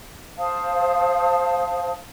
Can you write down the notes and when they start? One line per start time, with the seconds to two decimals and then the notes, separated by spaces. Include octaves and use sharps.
0.38 C5 F5 A5 D#6